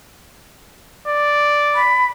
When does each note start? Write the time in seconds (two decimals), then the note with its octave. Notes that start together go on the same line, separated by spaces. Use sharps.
1.08 D5
1.75 B5